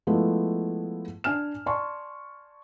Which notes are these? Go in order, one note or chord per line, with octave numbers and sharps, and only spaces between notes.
F3 G#3 A3 B3 E4
D4 G#5 F6 E7
D5 G#5 A5 C6 C#6